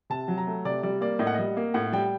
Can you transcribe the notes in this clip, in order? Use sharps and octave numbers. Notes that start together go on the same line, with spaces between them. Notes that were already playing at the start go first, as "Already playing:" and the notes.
C3 A5
F#3
A#5
A3
C3 D5
G3 D5
A#3 D5
A2 D#5
F#5
G3 D#5
A#3
A2 F#5
G3 G5